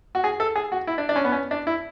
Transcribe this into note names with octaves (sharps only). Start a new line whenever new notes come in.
F#4
G#4
A4
G#4
F#4
E4
D4
D4
C#4
B3
C#4
D4
E4